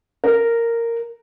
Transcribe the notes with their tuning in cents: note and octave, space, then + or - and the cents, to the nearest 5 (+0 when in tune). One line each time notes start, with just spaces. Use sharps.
A#4 -10